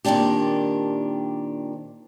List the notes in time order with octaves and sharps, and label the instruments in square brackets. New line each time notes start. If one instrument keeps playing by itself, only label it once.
[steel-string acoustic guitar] A#2 D#3 C4 D4 G4